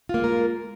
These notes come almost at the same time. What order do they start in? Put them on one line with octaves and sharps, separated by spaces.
F4 A#3 G#3 A#4